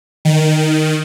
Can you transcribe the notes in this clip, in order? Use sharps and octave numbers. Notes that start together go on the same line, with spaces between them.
D#3